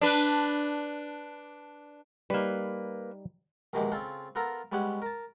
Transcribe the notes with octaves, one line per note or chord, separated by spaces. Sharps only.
D4 B4
G3 A#3 D#4 B4
A#1 B2 D#3 E3 G#3 G4
C#3 C4 F4 A4
B3 F4 A4 A#4 A#5
G3 G#3 B3 C#4 G4 F#5
A#4 A5